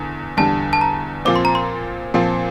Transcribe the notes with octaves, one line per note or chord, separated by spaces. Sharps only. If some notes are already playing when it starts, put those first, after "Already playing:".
Already playing: E2 D3
E2 D3 G3 A5
A5
A#5
A#2 F3 C4 D6
C6
A#5
C6
A#2 F3 C4 A5